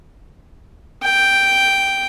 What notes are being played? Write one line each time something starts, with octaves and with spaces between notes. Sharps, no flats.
G5